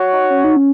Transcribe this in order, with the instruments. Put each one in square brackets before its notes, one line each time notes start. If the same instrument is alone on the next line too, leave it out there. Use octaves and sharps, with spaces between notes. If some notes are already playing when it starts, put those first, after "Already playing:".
Already playing: [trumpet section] F#4 C#5 F#5
[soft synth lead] D#4
C#4
D#4
C#4